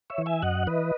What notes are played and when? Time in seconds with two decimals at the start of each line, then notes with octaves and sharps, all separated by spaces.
0.10 C#5 E5
0.18 E3
0.26 E5 G#5
0.42 F#2 D#5 F#5
0.67 E3 B4 D#5